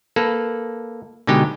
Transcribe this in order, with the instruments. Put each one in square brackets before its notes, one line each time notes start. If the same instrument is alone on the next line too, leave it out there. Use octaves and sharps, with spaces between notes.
[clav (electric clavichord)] A#3 A4 B4
B2 D3 G#3 D#4 G4